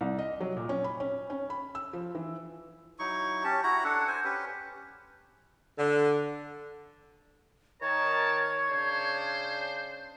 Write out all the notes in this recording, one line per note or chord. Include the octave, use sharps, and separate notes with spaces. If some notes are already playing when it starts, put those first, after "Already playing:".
C2
D#5
F#3
A#2
C#4
B5
C#4
C#4
B5
E6
F3
E3
F#3 D#4 E4 C#6
C#4 G4 A5
E4 F#4 A#5
D4 A4 F#5
C5 G#5
C#4 G4 B4
D3
D#3 A#4 C#5 A5 G#6
C#3 C#4 D4 C5